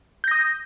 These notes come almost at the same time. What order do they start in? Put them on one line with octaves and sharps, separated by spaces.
G6 A#6 D#6